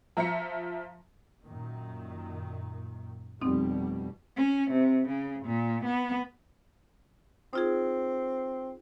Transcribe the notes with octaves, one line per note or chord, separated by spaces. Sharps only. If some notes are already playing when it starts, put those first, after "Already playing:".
F3 E5 A#5 A#6 C#7
F#2 A#2 D#3
F1 B2 G3 C4 D#4
C#4
C3
C#3
A#2
B3
C4 D#4 F4 G#4